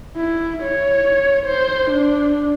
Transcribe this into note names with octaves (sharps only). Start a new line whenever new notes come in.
E4
C#5
C5
D4